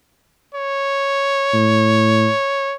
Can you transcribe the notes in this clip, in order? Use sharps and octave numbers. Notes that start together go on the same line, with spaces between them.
C#5
A2